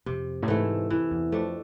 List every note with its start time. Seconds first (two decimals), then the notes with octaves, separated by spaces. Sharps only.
0.06 F2 C3
0.42 A2
0.48 G#2 E3 A3
0.90 F2 E3
1.11 E2
1.32 F2 A3 D4